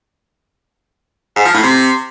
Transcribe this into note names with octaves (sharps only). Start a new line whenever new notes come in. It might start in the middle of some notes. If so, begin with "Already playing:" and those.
G#2
F3
A2
C3